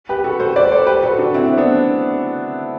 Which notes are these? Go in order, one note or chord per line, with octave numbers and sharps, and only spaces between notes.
G4 B4
F#4 A4
A4 C5
B4 D5
A4 C5
G4 B4
F#4 A4
D4 F#4
C4 E4
B3 D4